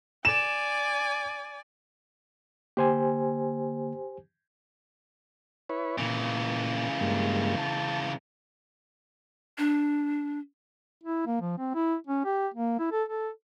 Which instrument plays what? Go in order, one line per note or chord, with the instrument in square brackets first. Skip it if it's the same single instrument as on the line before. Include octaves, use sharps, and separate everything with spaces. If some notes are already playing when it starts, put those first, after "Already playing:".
[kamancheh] D5 G#5 [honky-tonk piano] E7
[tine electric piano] D3 A#3 [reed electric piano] G4 C5 G#5
[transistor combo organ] E4 B4 C#5
[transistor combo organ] A#2 [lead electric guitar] C#3 E3
[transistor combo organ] G2 G#3 A#3
A5
[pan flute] D4
[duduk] E4
A#3
F3
C4
E4
C#4
G4
A#3
E4
A4
A4